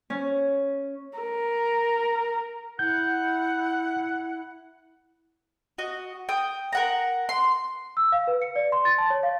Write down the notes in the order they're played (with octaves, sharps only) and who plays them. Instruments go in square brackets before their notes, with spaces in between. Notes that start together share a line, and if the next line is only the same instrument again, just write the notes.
[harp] C#4
[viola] A#4
[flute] E4 [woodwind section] F#5 [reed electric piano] G6
[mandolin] F#4 D#5
G5 D#6
A#4 F#5 A#5
C6
[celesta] E6
F5
B4
C#7
D5
C6
A6
A5
C#5
F5